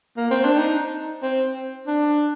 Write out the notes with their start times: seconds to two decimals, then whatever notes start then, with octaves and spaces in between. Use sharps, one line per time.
0.17 A#3
0.30 C4
0.45 D4
0.58 D#4
1.22 C4
1.87 D4